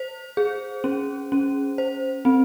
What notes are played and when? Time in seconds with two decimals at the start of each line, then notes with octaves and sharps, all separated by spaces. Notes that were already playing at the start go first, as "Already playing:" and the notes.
Already playing: C5
0.37 G#4
0.84 C#4
1.32 C#4
1.78 C5
2.25 C4